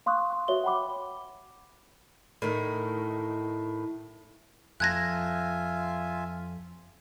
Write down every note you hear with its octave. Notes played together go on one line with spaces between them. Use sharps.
F5 C6 C#6 D#6 F#6
C6
F#4 B4 C#5 E5 G7
F#5 G5 B5 D6
A2 D#3
F2 F4 E5 G#5 A5 F#6 G#6 A#6